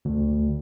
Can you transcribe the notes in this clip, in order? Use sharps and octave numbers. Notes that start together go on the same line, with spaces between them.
D2